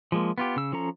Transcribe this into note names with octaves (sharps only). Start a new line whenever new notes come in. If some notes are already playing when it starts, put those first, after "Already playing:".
F3 G#3 A#3
B3 F4 G4
C#3 E6
F3 C#4 A4 A#5